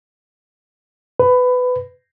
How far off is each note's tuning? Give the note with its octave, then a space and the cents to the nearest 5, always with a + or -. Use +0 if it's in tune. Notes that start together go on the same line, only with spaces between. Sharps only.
B4 +20